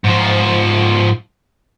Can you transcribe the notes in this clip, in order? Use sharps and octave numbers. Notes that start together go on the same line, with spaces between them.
G#2 F3